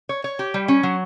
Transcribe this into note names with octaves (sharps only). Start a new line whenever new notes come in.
C#5
C#5
G4
G3
C#4
F#3